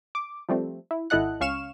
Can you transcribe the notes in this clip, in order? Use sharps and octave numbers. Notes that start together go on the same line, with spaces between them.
D6
F3 G3 A3 C4
E4
G#1 E4 A4 D#5 F#5 F#6
C#2 C#4 F5 C#6 F6 E7